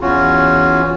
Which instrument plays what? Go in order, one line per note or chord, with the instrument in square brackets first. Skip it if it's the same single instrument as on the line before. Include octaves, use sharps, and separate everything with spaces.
[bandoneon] E2 E3 C#4 F4 F#4